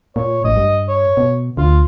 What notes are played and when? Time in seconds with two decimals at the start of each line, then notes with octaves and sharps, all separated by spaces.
0.16 A#2 C#5
0.44 A1 D#5
0.57 G2
0.89 C#5
1.17 B2
1.57 D2 F4